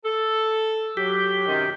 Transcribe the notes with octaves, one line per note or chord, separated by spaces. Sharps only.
A4
F#3 G4
F#2 C3 D#3